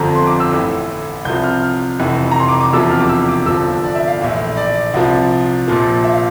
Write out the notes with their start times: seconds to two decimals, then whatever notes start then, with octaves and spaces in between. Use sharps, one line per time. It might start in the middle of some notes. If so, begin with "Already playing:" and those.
Already playing: G1 F2 D3 F3 A#5
0.15 C6
0.27 D6
0.40 E6
0.53 A1 A2 E3
1.25 C2 C3 F3 G6
1.43 F6
1.63 F6
1.99 F1 F2 E3
2.31 A#5
2.40 C6
2.49 D6
2.61 D6
2.73 E1 E2 C3 F3 E6
2.91 F6
3.00 D6
3.09 E6
3.29 D6
3.46 G1 G2 F3 E6
3.84 D5
3.95 E5
4.08 F5
4.21 A#1 A2 E3
4.57 D5
4.94 C2 C3 F3
5.68 A#1 A#2 F3
6.04 E5
6.12 F5